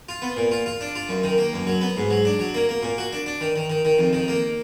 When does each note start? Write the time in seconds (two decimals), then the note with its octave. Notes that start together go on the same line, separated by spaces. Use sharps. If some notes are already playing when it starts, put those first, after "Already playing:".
0.09 F4
0.22 B3
0.37 A#2
0.51 F4
0.66 F4
0.81 D4
0.96 F4
1.09 F#2
1.24 D#3
1.38 A#3
1.53 F#2
1.67 F#3
1.81 B3
1.97 G#2
2.10 F#3
2.25 D4
2.39 F#3
2.54 A#3
2.69 A#3
2.83 A#2
2.98 F#4
3.13 D4
3.26 D4
3.41 D#3
3.56 D#3
3.70 D#3
3.85 D#3
3.98 F2
4.13 D#3
4.28 A#3